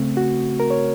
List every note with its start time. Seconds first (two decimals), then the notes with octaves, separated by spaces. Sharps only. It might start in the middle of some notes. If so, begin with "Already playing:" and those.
Already playing: C#3 A3 C4
0.17 F#4
0.60 A#4
0.70 C#5